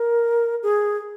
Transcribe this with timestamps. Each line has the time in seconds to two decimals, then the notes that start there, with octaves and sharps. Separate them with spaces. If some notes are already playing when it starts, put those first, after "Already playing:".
Already playing: A#4
0.63 G#4